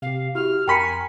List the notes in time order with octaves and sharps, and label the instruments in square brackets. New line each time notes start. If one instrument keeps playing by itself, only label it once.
[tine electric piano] C3 G4 [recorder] F5
[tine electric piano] E4 F#4 [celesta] G4 [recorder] F6
[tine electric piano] F2 [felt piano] A#4 B5 [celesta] G5 B6 C#7 [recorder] G#5